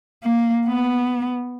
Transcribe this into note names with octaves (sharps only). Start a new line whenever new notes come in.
A#3
B3